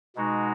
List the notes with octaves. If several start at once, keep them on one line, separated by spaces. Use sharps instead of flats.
B2 G#3 D#4 F#4